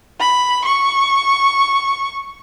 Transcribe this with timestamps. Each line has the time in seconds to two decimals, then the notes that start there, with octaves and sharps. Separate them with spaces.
0.20 B5
0.65 C#6